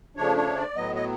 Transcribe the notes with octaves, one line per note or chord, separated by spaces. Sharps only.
C#3 F3 A3 D4 C#5
C#5
D5
A2 F#3 B3 D#5
D#5